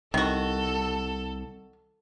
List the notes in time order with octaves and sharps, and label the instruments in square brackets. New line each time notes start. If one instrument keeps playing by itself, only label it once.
[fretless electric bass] C2 [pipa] D#3 F#4 [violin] A4